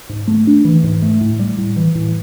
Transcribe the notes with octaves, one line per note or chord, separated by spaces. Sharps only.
G#2
A3
D4
E3
G#2
A3
A2
G3
A2
E3
A2